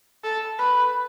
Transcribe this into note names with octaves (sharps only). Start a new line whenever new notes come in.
A4
B4